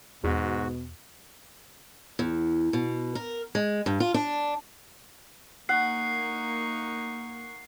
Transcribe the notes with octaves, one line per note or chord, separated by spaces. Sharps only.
E2 G#2 B2 F#4
E2
B2
A#4
G#3
G2
F4
D4
A#3 D#4 F#5 C#6 C7